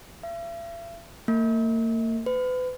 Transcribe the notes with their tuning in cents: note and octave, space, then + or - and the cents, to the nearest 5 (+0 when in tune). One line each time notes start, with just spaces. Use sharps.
E5 +45
A#3 -40
B4 +35